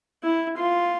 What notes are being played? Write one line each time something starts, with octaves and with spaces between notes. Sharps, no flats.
E4
F4